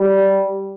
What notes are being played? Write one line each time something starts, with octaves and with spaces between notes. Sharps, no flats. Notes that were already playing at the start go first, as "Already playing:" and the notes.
Already playing: G3